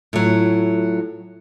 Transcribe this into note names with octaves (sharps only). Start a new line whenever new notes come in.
A2 F#3 E4 F4 A4